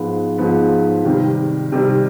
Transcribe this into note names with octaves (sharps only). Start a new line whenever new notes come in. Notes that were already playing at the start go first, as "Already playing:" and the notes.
Already playing: G#2 F3 G#3 B3
G#2 F3 G#3 B3
C3 D#3 G3
C3 D#3 G3